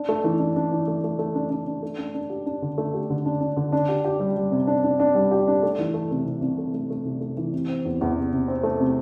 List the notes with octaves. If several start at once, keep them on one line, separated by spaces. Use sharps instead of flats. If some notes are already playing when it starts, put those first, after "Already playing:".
Already playing: D4
A3
E3
D4
D4
E3
A3
A3
A3
D4
D4
D4
A3
D4
D4
G4
D4
D3
A3
G4
D3
D4
D4
D3
D4
G4
G4
G3
G3
C3
D4
D4
D4
G3
G4
D4
A3
E3
A3
C3
C2
C2
A3
A3
A3
C2
A3
E3
C3
C4
E2
E2
C3
C3
C4
A3
C3